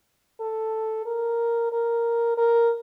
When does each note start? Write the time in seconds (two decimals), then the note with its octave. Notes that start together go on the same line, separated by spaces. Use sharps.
0.40 A4
1.06 A#4
1.72 A#4
2.37 A#4